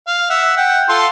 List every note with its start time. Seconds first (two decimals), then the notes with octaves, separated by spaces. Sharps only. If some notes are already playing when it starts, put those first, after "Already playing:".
0.07 F5
0.30 E5 F#5
0.57 F#5 G5
0.89 F4 A4 C6